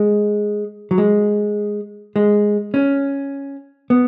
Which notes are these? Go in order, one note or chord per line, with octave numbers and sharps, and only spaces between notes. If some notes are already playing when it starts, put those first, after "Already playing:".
Already playing: G#3
F#3
G#3
G#3
C#4
B3